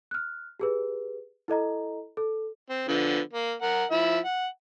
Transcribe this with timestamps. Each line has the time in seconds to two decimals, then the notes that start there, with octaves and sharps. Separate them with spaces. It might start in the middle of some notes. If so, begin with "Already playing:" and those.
0.11 F6 F#6
0.60 G4 G#4 B4
1.48 E4 A4 D#5 A#5
2.17 A4
2.70 C4
2.88 D3 F3 B3
3.33 A#3
3.62 A#4 F#5
3.91 F3 E4 E5
4.25 F#5